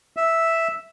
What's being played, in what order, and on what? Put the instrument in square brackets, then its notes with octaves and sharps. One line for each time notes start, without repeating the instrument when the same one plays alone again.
[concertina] E5